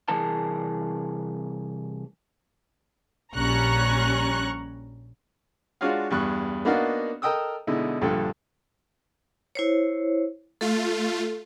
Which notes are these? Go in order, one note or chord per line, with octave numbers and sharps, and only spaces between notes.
C2 E3 G#4 A#4 A5
A#1 G3 C#4 A#5 C#6 F#6
G#3 D4 F4 F#4 C#5 F5
E2 G2 C#6 F#6
A#3 B3 D4 D#4 F#4 F5
A4 A#4 D#5 G5 D#6 E6
B2 D3 G#3 D#4 E4
A#1 G2 D3 A4 G5
E4 C5 C#5
A3 F4 A4